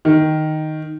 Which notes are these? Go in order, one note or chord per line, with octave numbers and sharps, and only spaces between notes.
D#3